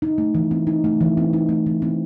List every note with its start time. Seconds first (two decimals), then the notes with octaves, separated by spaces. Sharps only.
0.02 D#4
0.18 A3
0.35 E3
0.51 C4
0.67 D#4
0.84 A3
1.01 E3
1.17 C4
1.33 D#4
1.49 A3
1.66 E3
1.82 C4